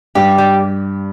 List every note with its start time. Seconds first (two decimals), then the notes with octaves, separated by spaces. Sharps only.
0.15 G2 G4
0.38 G3